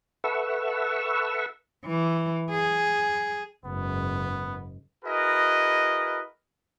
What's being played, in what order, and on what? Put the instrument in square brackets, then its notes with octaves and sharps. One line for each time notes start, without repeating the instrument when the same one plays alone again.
[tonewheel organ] A4 B4 E5 F#5 C#6 E6
[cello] E3
G#4
[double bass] F#1 G#2 [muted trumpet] B3
[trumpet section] E4 F#4 G#4 A#4 B4 D#5